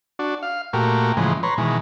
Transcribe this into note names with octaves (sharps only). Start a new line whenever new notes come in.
D4 F#4
F5
A#2 A3 F#4 G4 A#4
A2 C#3 E3 F3 G#3
B4 C#5 A#5 C6
B2 D#3 E3 G#3